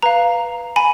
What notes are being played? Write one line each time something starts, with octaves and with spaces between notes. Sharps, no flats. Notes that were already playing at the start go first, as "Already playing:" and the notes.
B4 F5 A#5
G#5 B5